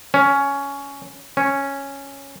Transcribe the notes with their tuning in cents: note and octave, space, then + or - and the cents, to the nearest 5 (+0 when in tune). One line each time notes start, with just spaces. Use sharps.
C#4 +10
C#4 -5